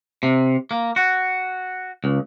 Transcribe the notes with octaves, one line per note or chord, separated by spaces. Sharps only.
C3
A#3
F#4
C#2